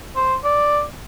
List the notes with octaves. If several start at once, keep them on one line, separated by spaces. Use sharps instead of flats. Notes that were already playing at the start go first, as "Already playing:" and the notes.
C5
D5